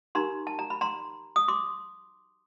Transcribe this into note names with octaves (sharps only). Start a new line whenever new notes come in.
D#4 G4 A#4 A#5 C6
A5
A#5
B5
A#5 C6
D#6
C6 D6